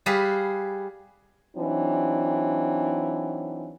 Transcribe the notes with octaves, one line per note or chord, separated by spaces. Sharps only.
G3 G#4 B4 F5
E3 F#3 C4 D4 D#4